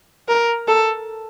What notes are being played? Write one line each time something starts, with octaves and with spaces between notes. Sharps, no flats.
A#4
A4